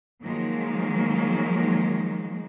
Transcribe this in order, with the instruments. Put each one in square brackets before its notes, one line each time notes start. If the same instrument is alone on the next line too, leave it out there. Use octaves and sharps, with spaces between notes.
[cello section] D#3 F3 F#3 G#3 A#3